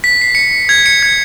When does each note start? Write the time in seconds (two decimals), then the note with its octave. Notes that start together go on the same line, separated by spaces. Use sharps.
0.04 B6
0.21 C7
0.35 C#7
0.69 G#6
0.86 C#7
1.03 G#6